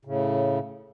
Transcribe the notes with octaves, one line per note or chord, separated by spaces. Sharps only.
A2 C#3